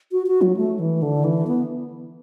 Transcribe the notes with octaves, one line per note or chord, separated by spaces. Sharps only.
F#4
F#4
F#3
A3
E3
D3
E3
B3